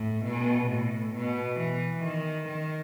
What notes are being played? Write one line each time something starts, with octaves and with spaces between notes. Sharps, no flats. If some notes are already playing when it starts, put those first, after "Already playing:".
Already playing: A2
B2
A2
B2
E3
D#3
D#3